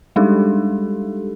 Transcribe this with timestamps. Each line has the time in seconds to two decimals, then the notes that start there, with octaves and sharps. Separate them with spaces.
0.16 G3 G#3 D4 D#4 G4 A4